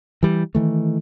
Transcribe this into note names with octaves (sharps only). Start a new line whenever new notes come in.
E3 G3
D#3 E3 A3